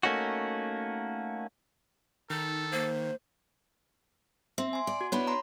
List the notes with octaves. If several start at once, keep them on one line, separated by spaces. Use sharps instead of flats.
A3 A#3 C#4 D#4 F#4
D#3 D#4 A4
A#3 C5
C4 E5
G#5 C6
D5
F#4
B3 D4 E4 C#5 B5
A#5 C6